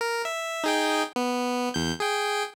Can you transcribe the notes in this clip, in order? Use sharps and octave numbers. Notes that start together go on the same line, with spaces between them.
A#4
E5
D#4 G#4 G5
B3
E2 G6
G#4 G5